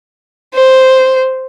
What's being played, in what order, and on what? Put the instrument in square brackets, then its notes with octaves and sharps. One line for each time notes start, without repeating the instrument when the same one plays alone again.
[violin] C5